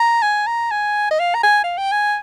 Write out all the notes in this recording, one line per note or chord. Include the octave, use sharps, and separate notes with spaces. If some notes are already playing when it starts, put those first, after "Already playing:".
Already playing: A#5
G#5
A#5
G#5
D#5
F5
A#5
G#5
F5
G5
G#5